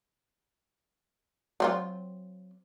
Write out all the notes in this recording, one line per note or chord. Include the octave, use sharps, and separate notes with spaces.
F#3 C4 F4